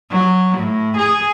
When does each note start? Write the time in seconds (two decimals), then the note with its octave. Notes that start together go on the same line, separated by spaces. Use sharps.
0.11 F#3
0.58 A2
0.97 G#4